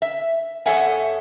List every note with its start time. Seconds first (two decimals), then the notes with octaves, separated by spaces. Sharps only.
0.02 E5
0.66 F2 A4 C#5 E5 F#5 G#5